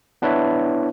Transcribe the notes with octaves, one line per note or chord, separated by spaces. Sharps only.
B3 D4 E4 B4 C#5 E5